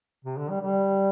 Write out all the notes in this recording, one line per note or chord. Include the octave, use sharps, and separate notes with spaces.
C3
D3
G3
G3